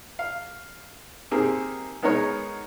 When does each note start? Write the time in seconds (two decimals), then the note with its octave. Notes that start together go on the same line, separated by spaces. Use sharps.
0.19 F5
1.31 A#3 C4 D#4 G4 G#4
2.02 G#3 B3 D#4 A#4 C#5